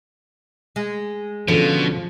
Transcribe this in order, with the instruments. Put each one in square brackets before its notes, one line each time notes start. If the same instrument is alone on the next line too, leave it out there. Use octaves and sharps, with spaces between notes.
[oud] G#3
[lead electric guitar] B2 [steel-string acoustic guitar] D3 C#4 [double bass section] F3